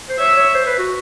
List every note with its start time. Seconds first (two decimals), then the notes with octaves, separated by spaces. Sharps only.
0.09 C5
0.18 C#5 E5
0.37 C#5
0.55 C5
0.66 B4
0.78 F#4